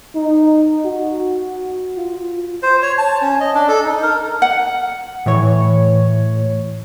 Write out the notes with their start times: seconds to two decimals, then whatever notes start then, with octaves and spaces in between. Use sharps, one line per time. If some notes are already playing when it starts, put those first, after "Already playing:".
0.15 D#4
0.85 F#4
1.97 F4
2.63 C5
2.82 C#5
2.98 A5
3.22 C#4
3.40 D#5
3.55 D4
3.68 A4
3.84 D#4
4.03 A#4
4.42 F#5
5.26 A2 E3 C#5